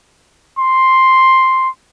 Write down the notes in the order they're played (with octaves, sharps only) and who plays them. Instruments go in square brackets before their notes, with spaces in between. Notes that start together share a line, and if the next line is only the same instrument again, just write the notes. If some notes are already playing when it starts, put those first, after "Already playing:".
[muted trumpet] C6